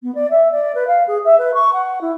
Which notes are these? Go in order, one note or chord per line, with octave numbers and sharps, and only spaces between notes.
B3
D5
E5
D5
B4
F5
G#4
E5
B4
C#6
F#5
E4